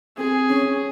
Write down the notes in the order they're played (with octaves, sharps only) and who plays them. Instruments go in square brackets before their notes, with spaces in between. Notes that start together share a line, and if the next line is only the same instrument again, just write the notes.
[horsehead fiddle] C4 [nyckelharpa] G#4
[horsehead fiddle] C#4